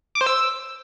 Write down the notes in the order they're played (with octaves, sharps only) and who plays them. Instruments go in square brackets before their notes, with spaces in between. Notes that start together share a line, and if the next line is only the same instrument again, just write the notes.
[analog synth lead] D6
C5
E6